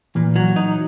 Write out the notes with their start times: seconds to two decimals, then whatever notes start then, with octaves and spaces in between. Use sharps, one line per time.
0.15 A#2 E3
0.36 F#3
0.56 D#4